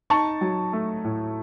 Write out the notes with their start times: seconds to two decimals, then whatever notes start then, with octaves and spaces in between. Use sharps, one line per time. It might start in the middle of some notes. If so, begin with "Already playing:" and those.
0.10 D#4 A5 C#6
0.41 F#3
0.73 A3
1.04 A2